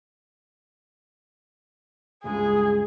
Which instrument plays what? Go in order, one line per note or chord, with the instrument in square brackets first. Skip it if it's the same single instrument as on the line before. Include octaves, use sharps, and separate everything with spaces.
[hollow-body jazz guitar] C#2 G2 G#3 [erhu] G#4